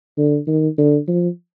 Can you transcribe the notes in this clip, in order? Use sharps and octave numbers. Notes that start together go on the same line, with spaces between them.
D3
D#3
D3
F3